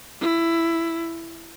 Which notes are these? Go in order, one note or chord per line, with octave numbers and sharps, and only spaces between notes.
E4